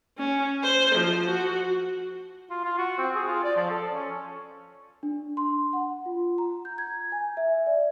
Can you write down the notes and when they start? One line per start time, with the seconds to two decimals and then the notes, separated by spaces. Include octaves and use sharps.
0.18 C#4
0.63 C5
0.95 F3
1.26 F#4
2.50 F4
2.64 F4
2.78 F#4
2.98 C4
3.15 G#4
3.28 F4
3.44 D5
3.56 F3
3.70 A4
3.93 C#4
5.03 D4
5.37 C6
5.73 F#5
6.06 F4
6.38 A#5
6.65 G6
6.78 G#6
7.12 G#5
7.37 E5
7.67 D5